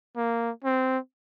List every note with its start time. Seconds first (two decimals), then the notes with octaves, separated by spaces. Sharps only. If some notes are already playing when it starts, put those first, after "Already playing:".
0.17 A#3
0.64 C4